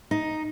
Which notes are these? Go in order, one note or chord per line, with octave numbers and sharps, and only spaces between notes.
D#4